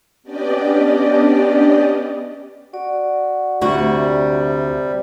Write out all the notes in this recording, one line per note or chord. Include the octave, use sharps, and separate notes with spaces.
B3 C#4 D4 G4 D5 D#5
F#4 D5
D2 C3 G3 F#4